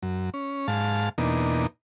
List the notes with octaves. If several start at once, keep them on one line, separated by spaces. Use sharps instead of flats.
F#2
C#4
G#2 F5 A5
E2 B2 A#3 D4 D#4